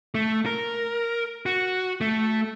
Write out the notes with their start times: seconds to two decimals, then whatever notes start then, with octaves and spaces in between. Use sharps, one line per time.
0.15 A3
0.46 A#4
1.46 F#4
2.01 A3